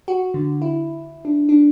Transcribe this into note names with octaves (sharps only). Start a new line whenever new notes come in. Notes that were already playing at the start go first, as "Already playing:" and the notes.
F#4
D3
E4
D4
D4